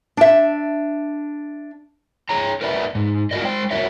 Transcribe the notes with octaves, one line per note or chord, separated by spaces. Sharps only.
D4 E5
G#4 C#5 A#5
A#4 B4 D5 E5 A5
G#2
F4 F#4 A#4 D5 D#5
G#3 C5 G5
F#4 A#4 C#5 D5 E5